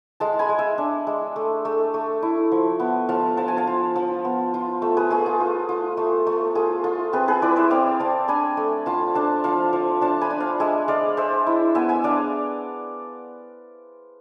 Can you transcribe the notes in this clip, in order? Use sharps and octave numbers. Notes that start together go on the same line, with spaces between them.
G#3 F5 A5
G#5 B5
G#3
E5 G#5
D4
G#3
A3
A3
A3
E4
F3
B3
F3 F5 A5
F3 A5
G#5
F5 A5
F4
F3
B3
F4
A3
G#4 B4
A3 G#4
F4
F4
F4
A3
A3
F4 G#4
F4
C4 G#4 B4
G#4 B4
E4 B4 D5
C5 E5
C4 D5 F5
C4 F5 A5
D4 G#5 B5
A3
F4 F5 A5
D4 F5 A5
F3 F5 A5
F3
D4 F5 A5
G#5 B5
D4
F5 A5
G#3 E5 G#5
G#3 D5 F5
G#3 C5 E5
E4
B3 E5 G#5
E5 G#5
D4 D5 F5